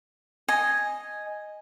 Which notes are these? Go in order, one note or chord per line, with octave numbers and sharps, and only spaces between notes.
D#5 G#5